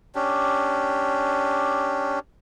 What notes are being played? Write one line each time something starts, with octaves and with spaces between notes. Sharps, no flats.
C#4 D4 G4